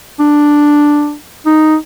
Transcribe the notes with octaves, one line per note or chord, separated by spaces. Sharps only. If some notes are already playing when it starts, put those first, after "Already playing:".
D4
D#4